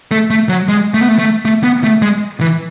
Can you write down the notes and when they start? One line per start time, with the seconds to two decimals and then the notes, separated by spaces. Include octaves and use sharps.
0.11 A3
0.30 A3
0.49 F#3
0.68 G#3
0.94 A3
1.01 B3
1.08 A3
1.19 A3
1.45 A3
1.64 B3
1.84 A3
2.02 G#3
2.41 E3